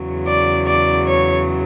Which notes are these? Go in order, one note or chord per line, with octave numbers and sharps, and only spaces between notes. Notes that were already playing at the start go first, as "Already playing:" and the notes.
Already playing: E2 C#3 F#3
D5
D5
C#5